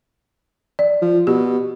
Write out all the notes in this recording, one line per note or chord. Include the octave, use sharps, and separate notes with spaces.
D5
F3
B2 G4